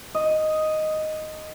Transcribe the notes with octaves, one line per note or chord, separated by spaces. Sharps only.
D#5